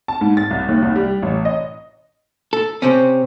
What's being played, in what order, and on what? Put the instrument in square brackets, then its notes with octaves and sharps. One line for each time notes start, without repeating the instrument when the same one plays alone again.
[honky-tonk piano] A5
G#2
A6
C2
D#2
C2
G3
A1
D#5
[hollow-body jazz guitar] A4
C3 C4 C#4